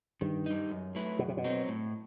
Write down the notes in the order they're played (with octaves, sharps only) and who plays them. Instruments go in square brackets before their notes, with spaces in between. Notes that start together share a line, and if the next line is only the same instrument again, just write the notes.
[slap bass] G2 [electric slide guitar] D#3
[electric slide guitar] G3 D#4
F#2
F#3 A3 E4 B4
[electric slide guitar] F#2 [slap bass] B2
[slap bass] C3
B2
[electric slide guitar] F#3 C4
A2